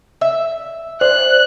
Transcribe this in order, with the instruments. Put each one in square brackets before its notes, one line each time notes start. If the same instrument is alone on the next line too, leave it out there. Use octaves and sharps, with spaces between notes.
[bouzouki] E5
[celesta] C5 [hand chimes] D5 [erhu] F#6